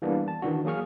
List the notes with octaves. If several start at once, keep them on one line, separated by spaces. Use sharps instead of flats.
E3 G3 A#3 B3 D4
A5
D#3 E3 D4 F#4
F#3 A#3 G#4 C#6 F6